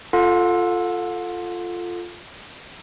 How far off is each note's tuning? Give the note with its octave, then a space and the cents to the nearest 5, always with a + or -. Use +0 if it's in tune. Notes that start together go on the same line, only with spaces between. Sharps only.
F4 +0 A4 +0 F#5 -45